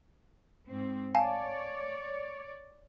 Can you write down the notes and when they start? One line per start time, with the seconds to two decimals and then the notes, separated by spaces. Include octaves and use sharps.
0.68 G#2 C4
1.15 C#5 D5 F5 G#5 A5